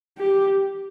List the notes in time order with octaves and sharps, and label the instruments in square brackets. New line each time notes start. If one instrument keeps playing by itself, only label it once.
[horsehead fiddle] G4